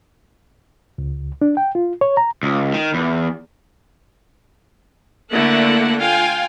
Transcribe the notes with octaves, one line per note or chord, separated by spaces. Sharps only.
C#2
D4
G5
F4
C#5
A#5
C#2
D#3
E2
D3 A3 A#3 E4 A4 F#5
F4 F5 G5 G#5